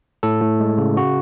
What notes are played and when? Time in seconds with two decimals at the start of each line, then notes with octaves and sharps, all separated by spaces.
0.23 A2 A4
0.41 A2
0.60 G#3
0.78 C#3
0.97 C#3 F#4